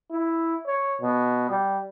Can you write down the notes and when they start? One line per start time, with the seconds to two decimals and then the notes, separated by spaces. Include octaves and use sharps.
0.11 E4
0.66 C#5
1.02 B2
1.50 G3